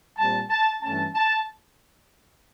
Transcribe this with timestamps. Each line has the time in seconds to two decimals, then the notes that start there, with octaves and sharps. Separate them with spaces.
0.17 A#2 G3 C4 A5
0.50 A5
0.83 G2 E3 A3 C#4 A5
1.15 A5